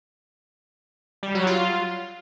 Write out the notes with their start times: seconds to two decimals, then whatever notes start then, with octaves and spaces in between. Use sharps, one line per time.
1.23 G3
1.35 F#3
1.47 F4